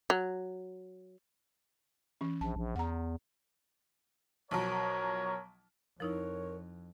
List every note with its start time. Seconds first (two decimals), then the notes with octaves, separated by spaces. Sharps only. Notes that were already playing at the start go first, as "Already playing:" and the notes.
0.10 F#3
2.21 E3 C#4
2.41 A#1 A5
2.56 A#1
2.76 E2 F#5 A#5
4.51 B1 F3 F#3 A#4 C#5
6.00 F2 F3 D#4 E4 A#4 C#5